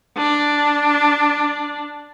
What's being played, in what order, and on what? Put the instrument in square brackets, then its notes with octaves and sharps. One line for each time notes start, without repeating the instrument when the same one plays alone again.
[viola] D4